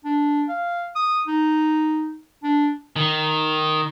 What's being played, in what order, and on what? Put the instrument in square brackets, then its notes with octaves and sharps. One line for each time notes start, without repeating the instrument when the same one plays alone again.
[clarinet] D4
F5
D#6
D#4
D4
[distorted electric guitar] D#3